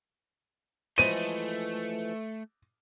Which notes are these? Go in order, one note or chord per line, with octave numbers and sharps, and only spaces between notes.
E3 F3 G#3 A3 D#7